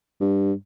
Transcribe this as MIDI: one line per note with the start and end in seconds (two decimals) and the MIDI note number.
0.21 0.53 43